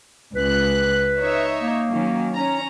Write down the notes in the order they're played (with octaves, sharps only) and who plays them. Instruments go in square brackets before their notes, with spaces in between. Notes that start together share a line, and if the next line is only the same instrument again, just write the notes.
[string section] C#2 F#6 [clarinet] B4
[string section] D#4 C#5 E5
[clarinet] A#3
[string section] D#3 F#3 C#4
C#4 A#5